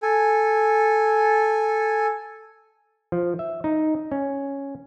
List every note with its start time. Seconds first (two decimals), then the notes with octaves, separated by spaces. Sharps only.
0.03 A4 G#5
3.12 F3
3.39 E5
3.64 D#4
4.12 C#4